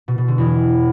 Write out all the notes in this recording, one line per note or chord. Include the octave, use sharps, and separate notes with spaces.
B2
B2
D3
E2